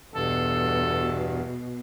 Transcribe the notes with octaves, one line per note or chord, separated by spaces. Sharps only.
E2 G2 B2 A4